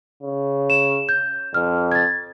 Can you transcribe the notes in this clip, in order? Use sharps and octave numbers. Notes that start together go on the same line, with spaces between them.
C#3
E7
G6
F2 F6
G#6 A6